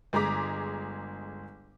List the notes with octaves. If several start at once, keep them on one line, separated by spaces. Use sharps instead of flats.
G1 G#3 G#4 A#5 D6 B6